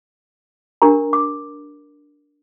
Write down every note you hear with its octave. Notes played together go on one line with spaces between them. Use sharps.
D4 G4 A#4 A#5
D6